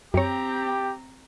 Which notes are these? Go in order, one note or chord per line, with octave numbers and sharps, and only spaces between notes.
F#2 C4 G4 C#5 A#5